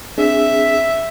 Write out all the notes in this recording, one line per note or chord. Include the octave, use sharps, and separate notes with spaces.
C4 D4 G#4 E5